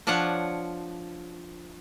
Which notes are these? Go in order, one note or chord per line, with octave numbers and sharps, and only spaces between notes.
F3 D4 F4 C#5 F#5